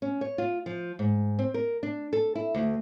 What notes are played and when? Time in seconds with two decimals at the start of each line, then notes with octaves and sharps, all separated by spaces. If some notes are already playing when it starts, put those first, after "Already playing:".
0.02 C#4
0.21 C#5
0.38 F4
0.66 F3
0.99 G#2
1.39 C4
1.54 A#4
1.83 D4
2.13 A4
2.35 E4
2.54 D2